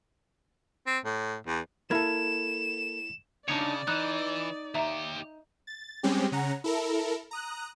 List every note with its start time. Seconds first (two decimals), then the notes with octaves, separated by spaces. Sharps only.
0.87 C4
1.05 A2
1.47 E2
1.91 A#3 E4 A4 B5 G#6 E7
3.48 C#3 D4 D#4 C#5 D5
3.87 E3 D#4 F#6
4.75 D#2 G4 E5 A#5
5.67 A6
6.03 G3 G#3 C4 C#4 G4
6.32 C#3 C#4 F#5 A#5
6.64 E4 A4 A#4
7.31 A#5 D#6 F#6